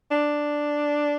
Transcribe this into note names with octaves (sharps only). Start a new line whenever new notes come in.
D4